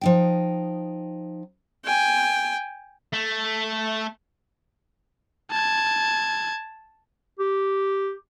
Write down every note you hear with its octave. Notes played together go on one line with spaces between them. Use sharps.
F3 D#4 G5
G5 G#5
A3
A5 G#6
G4